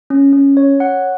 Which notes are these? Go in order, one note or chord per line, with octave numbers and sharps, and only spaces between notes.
C#4
C#4
C#5
F#5